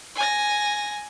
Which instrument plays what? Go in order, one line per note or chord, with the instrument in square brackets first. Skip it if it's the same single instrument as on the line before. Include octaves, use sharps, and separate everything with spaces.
[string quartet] G#5 A#6